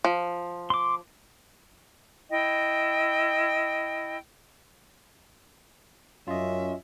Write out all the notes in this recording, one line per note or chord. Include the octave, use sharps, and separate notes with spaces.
F3
C6 D6
E4 D#5 G5
F#2 C#4 F4 D#5 E5